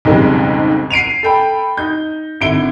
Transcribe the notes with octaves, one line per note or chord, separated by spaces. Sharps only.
B1 F2 G#2 C#3 G3 G#3
C7 D7 D#7 F7
A4 G5 B5
D#4 G6
G#1 D3 E4 D7 G7